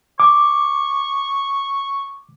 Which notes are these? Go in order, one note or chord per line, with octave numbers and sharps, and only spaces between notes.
C#6 D6